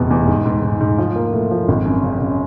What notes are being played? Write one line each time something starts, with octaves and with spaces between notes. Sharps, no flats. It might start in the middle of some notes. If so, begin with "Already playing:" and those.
Already playing: F1 E2 B2
E2
G#2
G#2
G#2
G#2
F3
A#3
A2
F3
G#1
F#2
C#3
C#3